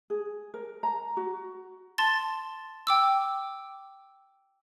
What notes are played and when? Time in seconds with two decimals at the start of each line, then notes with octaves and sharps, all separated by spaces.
0.10 G#4
0.54 A#4
0.83 A#5
1.17 F#4
1.98 A5 C6 A6
2.87 G5 D6 E6